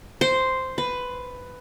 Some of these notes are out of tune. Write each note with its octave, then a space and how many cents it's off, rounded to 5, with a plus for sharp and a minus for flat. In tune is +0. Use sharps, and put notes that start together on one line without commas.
C5 -5
B4 +10